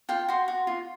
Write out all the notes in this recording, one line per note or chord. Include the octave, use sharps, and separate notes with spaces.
F4 G5
F#4 C6
F#4
F4